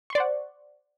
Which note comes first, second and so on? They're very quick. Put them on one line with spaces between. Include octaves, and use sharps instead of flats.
C#6 C6 D5 C5 F#5